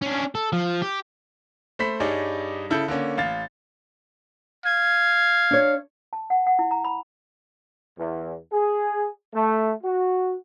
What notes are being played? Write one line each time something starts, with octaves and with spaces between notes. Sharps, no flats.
C#4 D4
A4
F3
G4
A3 C5 B5 B6
G2 G3 D#4 G#4 C#5 D5
C#3 E4 A4 G6
D3 A#3 C#4
A1 F5 A6
F5 G#6
D4 C#5
A5
F#5
F#5
E4
A#5
B5
E2
G#4
A3
F#4